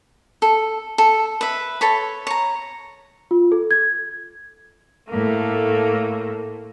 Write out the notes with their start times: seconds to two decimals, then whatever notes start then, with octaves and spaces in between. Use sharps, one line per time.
0.42 A4
0.98 A4
1.41 B4 E5
1.81 A4 C#5 B5
2.27 C#5 A#5
3.31 F4
3.52 A4
3.71 G#6
5.08 A2 A3 A#3